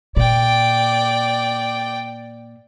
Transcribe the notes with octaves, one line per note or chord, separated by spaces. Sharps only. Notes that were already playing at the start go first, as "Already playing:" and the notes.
A#2 D5 G5